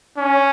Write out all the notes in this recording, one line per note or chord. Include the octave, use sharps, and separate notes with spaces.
C#4